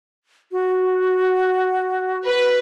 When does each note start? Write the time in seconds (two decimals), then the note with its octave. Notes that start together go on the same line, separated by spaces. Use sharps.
0.52 F#4
2.25 B4